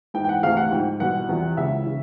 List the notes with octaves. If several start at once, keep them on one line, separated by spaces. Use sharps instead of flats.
G#2 E3 G5
G5
F#5
D2 C3 E3 F5
F#5
G#2 F3 G5
C2 B2 F#5
E2 C3 F3
C#2 C#3 E3 E5
C#3 E3